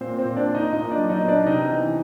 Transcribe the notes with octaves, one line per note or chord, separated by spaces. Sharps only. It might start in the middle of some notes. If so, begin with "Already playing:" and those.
A#2 C4 C5
C4 C5
A#2
D4 D5
A#2
D#4 D#5
A#2 D#4 D#5
D4 D5
F#3
D#4 D#5
B3
D4 D5
C3 D#4 D#5
E3